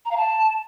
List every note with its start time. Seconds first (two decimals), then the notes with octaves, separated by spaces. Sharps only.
0.05 A#5
0.11 F5
0.17 A5